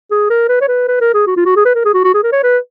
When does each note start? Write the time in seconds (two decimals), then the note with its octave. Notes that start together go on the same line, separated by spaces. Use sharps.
0.11 G#4
0.30 A#4
0.49 B4
0.61 C#5
0.68 B4
0.88 B4
1.01 A#4
1.14 G#4
1.27 F#4
1.36 F4
1.45 F#4
1.56 G#4
1.65 B4
1.75 A#4
1.85 G#4
1.94 F#4
2.04 F#4
2.14 G#4
2.23 A#4
2.32 C#5
2.43 B4